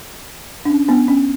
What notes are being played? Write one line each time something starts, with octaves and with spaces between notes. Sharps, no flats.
D4
C#4
B3 D4
C#4